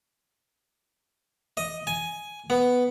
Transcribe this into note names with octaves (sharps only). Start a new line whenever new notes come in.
D#5
G#5
B3